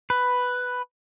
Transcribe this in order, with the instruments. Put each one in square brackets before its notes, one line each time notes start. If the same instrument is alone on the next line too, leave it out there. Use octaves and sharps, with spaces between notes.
[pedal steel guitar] B4